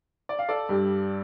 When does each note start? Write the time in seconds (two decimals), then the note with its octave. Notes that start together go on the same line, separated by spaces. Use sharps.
0.29 D5
0.39 F5
0.49 A4 D5
0.69 G2 G3